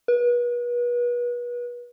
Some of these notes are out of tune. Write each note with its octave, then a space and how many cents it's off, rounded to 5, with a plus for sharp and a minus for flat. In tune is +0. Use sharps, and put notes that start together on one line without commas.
B4 -35